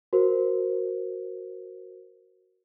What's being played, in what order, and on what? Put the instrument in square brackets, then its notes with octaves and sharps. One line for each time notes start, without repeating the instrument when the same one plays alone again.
[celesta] F#4 A#4 C5